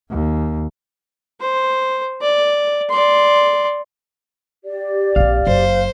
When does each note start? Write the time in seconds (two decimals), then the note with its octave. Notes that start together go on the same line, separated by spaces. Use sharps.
0.10 D#2
1.40 C5
2.21 D5
2.90 D5 C6
4.65 G4 D5
5.16 A#1 C4 F5
5.47 F#1 C5